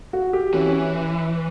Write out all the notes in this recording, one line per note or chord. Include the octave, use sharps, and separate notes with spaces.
F#4
G4
E3 C#4
C#4